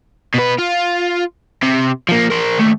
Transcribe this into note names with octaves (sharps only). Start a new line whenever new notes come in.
B2 B4
F4
C3
F3 A#3
A#4 C5
D#2 A3